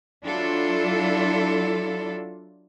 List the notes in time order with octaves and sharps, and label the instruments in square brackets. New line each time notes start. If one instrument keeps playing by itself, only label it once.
[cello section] F#3 D4 E4 F4 A4